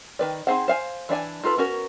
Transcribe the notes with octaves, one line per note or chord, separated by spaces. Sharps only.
D#3 B4 D5
C4 D#4 G#4 C5 F#5
C5 F5 G#5
E3 D4 D5 G#5
D#4 F4 A4 B4
B3 C#4 F#4 A#4